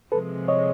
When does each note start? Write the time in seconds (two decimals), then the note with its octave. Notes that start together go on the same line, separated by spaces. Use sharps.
0.12 C3 F3 G#3 A4 B4
0.48 C#5 D#5